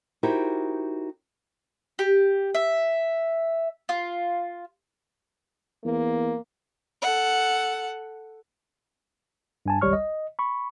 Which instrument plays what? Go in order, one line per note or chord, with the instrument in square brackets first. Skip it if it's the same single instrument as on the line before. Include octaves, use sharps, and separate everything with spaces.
[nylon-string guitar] D#4 E4 F#4 G4 A#4 C5
[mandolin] G4
E5
F4
[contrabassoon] E2 [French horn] A#3
[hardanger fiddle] A4 F#5
[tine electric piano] G2 G#5 A5
G#1 C#2 G3 C#5 C#6 F6
D#5
B5 C#6